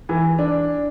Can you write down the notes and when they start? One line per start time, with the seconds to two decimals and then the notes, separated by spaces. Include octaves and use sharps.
0.09 E3
0.39 D4